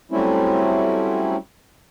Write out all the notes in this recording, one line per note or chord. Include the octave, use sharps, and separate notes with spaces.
F#3 G3 A3 C4 C#4 E4